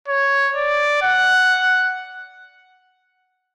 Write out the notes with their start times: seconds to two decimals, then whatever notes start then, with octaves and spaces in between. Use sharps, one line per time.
0.08 C#5
0.56 D5
1.02 F#5